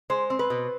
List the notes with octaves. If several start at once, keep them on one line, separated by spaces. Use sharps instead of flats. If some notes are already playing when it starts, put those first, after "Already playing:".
G#3 C5
C4
B4
B2